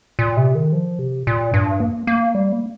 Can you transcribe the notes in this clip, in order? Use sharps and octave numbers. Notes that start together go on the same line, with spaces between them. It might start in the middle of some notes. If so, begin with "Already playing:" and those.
A#2
C3
D#3
F3
C3
A#2
G2
A#3
A#3
G3
A#3